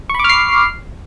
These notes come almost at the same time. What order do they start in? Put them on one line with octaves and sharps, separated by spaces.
C#6 B5 D6 F6 C7